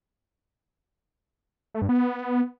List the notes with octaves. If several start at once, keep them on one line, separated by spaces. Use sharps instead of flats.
A3
G2
B3